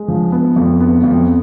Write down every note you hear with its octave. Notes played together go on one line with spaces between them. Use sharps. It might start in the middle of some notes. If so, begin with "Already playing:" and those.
Already playing: G#3
F3
B3
F2
B3
F2